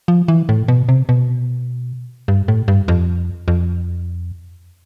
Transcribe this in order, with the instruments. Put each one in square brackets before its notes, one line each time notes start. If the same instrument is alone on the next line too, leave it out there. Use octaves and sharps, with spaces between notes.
[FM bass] F3
E3
A2
B2
C3
B2
G2
A2
G2
F2
F2